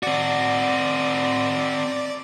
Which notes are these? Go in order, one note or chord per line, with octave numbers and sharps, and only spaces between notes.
C4 F#4 D5